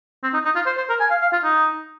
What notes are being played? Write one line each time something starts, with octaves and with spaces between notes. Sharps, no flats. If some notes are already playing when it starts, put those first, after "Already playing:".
C4
D#4
D#4
F4
C5
C5
A#4
G#5
F5
F5
F4
D#4